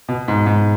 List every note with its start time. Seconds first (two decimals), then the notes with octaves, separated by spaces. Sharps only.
0.09 B2
0.28 G#2
0.46 G#2